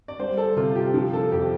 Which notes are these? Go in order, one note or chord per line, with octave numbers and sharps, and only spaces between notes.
D5
G3 C5
A4
C3 F4
G4
F3
A4
F2 G4